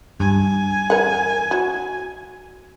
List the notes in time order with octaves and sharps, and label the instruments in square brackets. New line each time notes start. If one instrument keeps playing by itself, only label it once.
[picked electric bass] G2 [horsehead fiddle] G#5
[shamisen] A#4 F#5
F#4